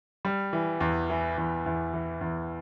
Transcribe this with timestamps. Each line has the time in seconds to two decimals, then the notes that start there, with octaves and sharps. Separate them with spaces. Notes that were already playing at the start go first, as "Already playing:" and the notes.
0.25 G3
0.53 E3
0.80 E2
1.10 E3
1.38 E2
1.66 E2
1.94 E3
2.21 E2